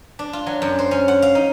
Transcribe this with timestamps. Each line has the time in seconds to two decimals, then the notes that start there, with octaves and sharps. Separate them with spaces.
0.19 D4
0.33 F4
0.47 F#3
0.62 F#2
0.79 C5
0.91 C#4
1.08 F#5
1.22 F5
1.35 D#4